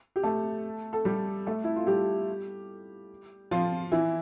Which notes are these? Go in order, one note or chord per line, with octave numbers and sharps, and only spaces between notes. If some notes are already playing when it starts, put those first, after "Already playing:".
G4
A3 A4
A4
G3 G4
A3 A4
E4
F4
G3 G4
F3 F4
E3 E4